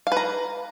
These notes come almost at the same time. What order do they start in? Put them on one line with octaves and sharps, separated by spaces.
F5 B4 A#5